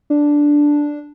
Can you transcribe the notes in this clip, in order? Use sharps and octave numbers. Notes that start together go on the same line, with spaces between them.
D4